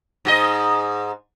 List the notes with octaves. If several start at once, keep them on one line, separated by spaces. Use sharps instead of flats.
G#2 F#4 D#5